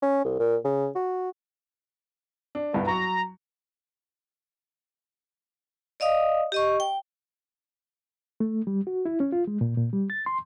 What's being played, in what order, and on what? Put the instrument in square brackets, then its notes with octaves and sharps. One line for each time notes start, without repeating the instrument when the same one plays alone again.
[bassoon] C#4
C2
A#2
C#3
F#4
[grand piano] D4
C2 G2 B3
[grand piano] F#3 C#6 [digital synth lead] A#5
[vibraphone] D5 D#5 F5 D#6
G4 D#5 C#6
G5
[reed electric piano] A3
G3
F#4
E4
C#4
F4
G#3
A#2
A#2
G3
A6
C6